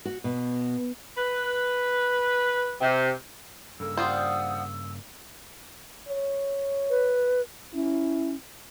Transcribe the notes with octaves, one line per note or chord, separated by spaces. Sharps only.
F#4
B2
B4
C3
G2 C#3 A#3 A4 E6
G3 F4 C5 F#5 D#6
C#5
B4
C#4 E4